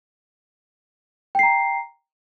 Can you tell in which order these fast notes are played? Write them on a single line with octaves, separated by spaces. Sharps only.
G5 C7 A#5